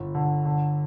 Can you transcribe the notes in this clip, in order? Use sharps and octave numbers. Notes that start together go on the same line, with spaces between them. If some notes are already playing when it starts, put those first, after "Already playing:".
Already playing: G1
D3
D3